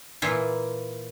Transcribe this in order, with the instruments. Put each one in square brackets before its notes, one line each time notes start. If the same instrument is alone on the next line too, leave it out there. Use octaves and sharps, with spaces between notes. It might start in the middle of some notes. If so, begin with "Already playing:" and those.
[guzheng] A#2 E3 A#3 E4 F4